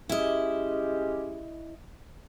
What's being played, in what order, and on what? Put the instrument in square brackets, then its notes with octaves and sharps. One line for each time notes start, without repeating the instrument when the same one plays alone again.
[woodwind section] G#3 C#4 G4 [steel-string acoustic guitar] E4 D#5